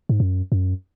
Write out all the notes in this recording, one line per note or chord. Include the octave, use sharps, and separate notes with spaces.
G#2
F#2
F#2